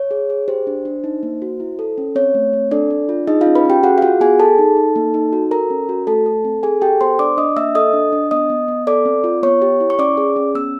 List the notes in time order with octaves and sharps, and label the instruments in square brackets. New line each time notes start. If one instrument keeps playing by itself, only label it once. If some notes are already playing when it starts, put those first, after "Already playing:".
Already playing: [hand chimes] C#5
G#4
G#4
G4 C5
D4
D4
D#4
A#3
F#4
E4
A4
C#4
C4 C#5
A3
C4
D4 A4 D5
D4
F4
D#4 G#4 D#5
F4 F5
C#4
B4 B5
C#4 G4 G5
F#4 G#4 F#5
F5
F4 F#4 F#5
B3 G#4 G#5
G#4 A4 A5
D#4
D#4
A#3
D#4
F#4
A4 A#4 A#5
C#4
F#4
A3 A4 A5
A4
C4
G#4 A4 G#5
G4 A4 G5
B3 C5 C6
D4 D5 D6
D4 D#5 D#6
A#3 E5 E6
A4 D#5 D#6
D4
D4
B3 D#5 D#6
B3
B3
A4 D5 D6
C4
F4
B3 C#5 C#6
G4
E4
C#6
C#4 D5 D6
G#4
C#4
B3 E6